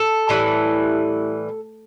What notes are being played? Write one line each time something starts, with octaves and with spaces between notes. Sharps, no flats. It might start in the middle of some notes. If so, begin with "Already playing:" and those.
Already playing: A4
A2 E3 G3